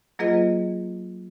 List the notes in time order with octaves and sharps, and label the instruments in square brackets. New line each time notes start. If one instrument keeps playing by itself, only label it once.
[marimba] F#3 A#3 F4 G#4 B4 D#5